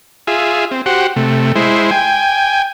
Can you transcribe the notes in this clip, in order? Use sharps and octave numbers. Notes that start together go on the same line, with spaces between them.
F4 G#4 E5
C4
F#4 G4 C5 F#5
C3 A3
G#3 E4 C5
G5 G#5